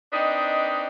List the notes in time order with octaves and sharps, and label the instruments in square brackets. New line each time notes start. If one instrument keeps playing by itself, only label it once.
[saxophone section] C4 D4 D#4 B4 D#5